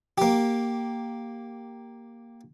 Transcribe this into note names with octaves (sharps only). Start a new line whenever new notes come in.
A#3 G4